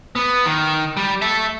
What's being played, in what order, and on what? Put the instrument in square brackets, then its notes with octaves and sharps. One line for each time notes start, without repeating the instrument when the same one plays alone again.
[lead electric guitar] B3
D#3
G3
E5 A5